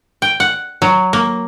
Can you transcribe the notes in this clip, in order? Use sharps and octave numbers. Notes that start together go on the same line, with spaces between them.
G5
F#5
F#3
A#3